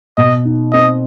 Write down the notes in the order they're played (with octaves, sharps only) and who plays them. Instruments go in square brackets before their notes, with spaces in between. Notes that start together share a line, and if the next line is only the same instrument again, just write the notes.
[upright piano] B2 [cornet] D#5
[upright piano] D#4
[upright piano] C4 [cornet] D#5